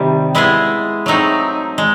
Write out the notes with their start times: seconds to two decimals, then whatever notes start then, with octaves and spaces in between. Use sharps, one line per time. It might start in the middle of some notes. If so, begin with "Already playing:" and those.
Already playing: C3 D#3 G3
0.35 G#3 B3 E4 G#4
1.06 F#3 A3 C4 D#4
1.78 G#3